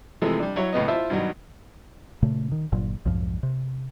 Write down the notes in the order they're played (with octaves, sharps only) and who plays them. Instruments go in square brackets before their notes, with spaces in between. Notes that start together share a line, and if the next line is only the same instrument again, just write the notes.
[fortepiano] C3 E3 F3 G#3 A3
G3 D4
F#3 E4 C#5
C#2 A2 B3 D#5
E4 F4 C5 E5 A5
G2 B2 D#3 F#3
[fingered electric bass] A#2 C#3 A3
D#3
G1 A#2 F#3
B1 F2 G#2 F3
C3